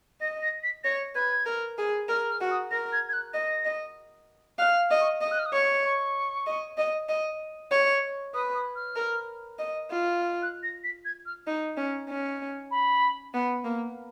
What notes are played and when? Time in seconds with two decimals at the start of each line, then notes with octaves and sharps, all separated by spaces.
0.21 D#5 A#6
0.42 A#6
0.63 B6
0.84 C#5 A#6
1.15 B4 G#6
1.46 A#4
1.78 G#4
2.09 A#4 F6
2.30 F6
2.41 F#4
2.51 D#6
2.71 A#4 A#6
2.92 G#6
3.09 G#6
3.13 F#6
3.33 D#5 A#6
3.65 D#5
4.59 F5 F#6
4.91 D#5
5.00 C#6
5.21 D#5 D#6
5.31 F#6
5.39 F6
5.46 D#6
5.53 C#5 C#6
5.84 C#6
6.47 D#5
6.78 D#5
7.09 D#5
7.71 C#5
8.34 B4 D#6
8.55 D#6
8.75 F6
8.96 A#4
9.59 D#5
9.90 F4
10.21 F6
10.42 F#6
10.63 A#6
10.84 B6
11.05 G#6
11.26 F6
11.47 D#4
11.77 C#4
12.09 C#4
12.71 B5
13.34 B3
13.65 A#3